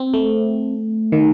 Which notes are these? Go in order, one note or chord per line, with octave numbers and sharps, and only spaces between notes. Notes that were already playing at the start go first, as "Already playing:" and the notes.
Already playing: C4
A3
D#3